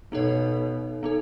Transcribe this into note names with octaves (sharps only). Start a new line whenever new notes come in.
B2 B3 D#4 A4 C#5
B3 D#4 A4